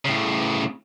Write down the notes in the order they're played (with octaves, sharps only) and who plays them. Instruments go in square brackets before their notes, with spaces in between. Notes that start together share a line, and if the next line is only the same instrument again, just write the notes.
[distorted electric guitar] A2 C#3